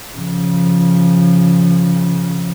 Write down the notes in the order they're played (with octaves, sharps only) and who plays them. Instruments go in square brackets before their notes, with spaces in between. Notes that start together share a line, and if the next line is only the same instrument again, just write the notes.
[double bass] C#3 F3